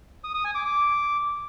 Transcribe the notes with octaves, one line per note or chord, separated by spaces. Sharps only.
D#6
D#6
G#5
D6
D6